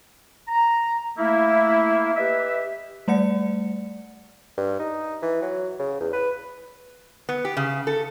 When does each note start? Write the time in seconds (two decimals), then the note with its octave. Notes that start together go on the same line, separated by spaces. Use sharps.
0.48 A#5
1.18 A3 A#3 E4
2.16 G4 B4 D#5 E5
3.08 G3 A3 D5 F#5 C#7
4.57 G2
4.79 D#4
5.22 E3
5.42 F#3
5.79 C#3
6.00 E2
6.13 B4
7.29 B3
7.45 G4
7.57 C#3
7.87 A4